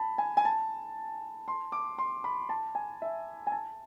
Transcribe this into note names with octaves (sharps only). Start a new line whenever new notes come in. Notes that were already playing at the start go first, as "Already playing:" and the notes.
Already playing: A5 B5
G#5
G#5
A5
C6
D6
C6
B5
A5
G#5
E5
G#5
A5